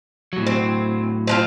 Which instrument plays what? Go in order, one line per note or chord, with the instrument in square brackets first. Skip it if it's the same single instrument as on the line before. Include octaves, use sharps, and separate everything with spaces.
[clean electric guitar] A2 F#3
[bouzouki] C4
C4 D4 F4